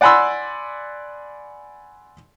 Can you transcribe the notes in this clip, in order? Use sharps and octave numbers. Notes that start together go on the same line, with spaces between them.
D5 F#5 G#5 B5 C6 E6